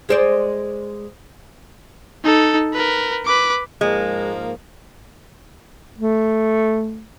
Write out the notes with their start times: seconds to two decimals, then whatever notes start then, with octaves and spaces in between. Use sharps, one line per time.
0.09 G#3 C5 D5
2.24 D#4 A4
2.73 A#4 B4
3.25 B4 D6
3.81 G#2 F3 G#3 A#3
5.98 A3